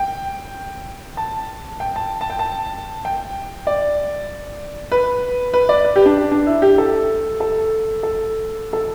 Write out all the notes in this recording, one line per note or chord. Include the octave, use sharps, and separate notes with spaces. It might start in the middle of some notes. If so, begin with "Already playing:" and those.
Already playing: G5
A5
G5
A5
A5
G5
A5
G5
D5
B4
B4
D5
B4
G4
D4
D4
E4
G4
A4
A4
A4
A4